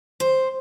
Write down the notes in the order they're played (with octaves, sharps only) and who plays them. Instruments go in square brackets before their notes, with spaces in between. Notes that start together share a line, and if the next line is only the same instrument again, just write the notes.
[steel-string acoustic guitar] C5